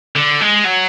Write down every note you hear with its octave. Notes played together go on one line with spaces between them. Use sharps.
D3
G#3
F#3